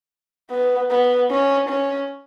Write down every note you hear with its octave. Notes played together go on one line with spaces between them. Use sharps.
B3
B3
C#4
C#4